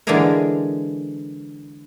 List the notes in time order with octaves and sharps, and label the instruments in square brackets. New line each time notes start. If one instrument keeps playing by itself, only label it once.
[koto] D3 E3 G#3 D4 G#4 A#4